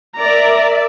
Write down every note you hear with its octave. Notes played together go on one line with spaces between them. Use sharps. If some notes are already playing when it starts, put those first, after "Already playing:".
A#4 D5 E5 A#5